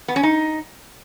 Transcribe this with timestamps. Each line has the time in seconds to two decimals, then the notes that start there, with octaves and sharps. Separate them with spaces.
0.08 B3
0.16 C#4
0.23 D#4